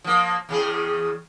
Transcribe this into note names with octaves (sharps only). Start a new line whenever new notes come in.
F3 A#3
E2 C#3 G#4